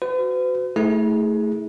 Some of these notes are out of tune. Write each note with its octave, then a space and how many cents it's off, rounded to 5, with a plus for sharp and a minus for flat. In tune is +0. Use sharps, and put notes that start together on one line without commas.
F#4 +0 B4 +45
A3 +0 E4 -40 G#4 +0